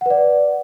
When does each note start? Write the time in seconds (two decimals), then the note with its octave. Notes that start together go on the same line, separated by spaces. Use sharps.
0.01 F#5
0.06 B4
0.10 D5